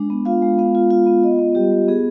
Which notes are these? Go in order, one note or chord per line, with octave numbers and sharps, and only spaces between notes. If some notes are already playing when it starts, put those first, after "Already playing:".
Already playing: G#3 D4
B3
F4 F5
G#3
B3 F5
F4
F4
B3
F4 D#5
B3
G3 G4
G3
B3 G#4